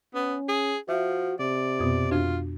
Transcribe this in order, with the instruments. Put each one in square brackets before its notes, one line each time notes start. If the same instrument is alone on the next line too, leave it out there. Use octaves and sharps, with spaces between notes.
[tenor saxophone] B3 [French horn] C#4
[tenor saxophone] G#4
[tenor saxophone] F3 [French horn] F#4 [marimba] E5
[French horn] C3 [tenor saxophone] D5
[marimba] F2 B2 B3
[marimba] F2 D4 F#4 [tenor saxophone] F4